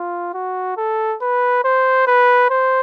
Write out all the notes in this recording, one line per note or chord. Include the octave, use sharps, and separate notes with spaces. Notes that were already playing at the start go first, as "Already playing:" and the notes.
Already playing: F4
F#4
A4
B4
C5
B4
C5